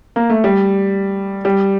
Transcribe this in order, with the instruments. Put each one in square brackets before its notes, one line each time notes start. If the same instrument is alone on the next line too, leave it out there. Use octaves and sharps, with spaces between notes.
[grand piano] A#3
A3
G3
G3